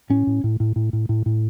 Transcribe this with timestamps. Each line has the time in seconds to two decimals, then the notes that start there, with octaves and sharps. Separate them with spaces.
0.10 A2 C#4
0.27 A2
0.44 A2
0.60 A2
0.76 A2
0.93 A2
1.09 A2
1.26 A2